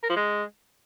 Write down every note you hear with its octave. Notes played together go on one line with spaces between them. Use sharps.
A#4
F3
G#3